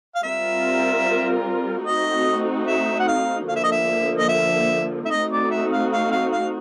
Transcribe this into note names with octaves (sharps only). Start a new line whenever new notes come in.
F5
G3 C4 F4 A#4 E5
A3 C4 D#4 F#4 D#5
E5
F#5
F5
D3 F3 A#3 F5
E5
D#5
E5
D#5
E5
E5
A3 C4 D#4 F#4 D#5
D5
E5
F5
F5
F5
F5